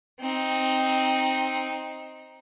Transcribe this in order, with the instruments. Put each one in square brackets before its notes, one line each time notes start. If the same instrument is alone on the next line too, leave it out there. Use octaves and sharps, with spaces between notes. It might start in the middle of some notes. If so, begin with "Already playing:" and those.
[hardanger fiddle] C4 D#4